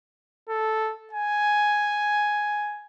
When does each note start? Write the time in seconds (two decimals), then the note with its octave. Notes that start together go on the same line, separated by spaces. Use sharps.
0.49 A4
1.13 G#5